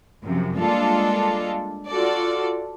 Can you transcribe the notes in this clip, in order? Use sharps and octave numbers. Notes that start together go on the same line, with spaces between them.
F#2 C3 F3
G3 G#3 A#3 D4 F4 A4
F4 F#4 A4 D5